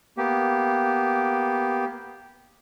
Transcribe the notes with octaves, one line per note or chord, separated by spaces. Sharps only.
A#3 B3 G4